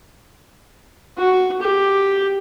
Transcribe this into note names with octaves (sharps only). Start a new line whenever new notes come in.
F#4
G4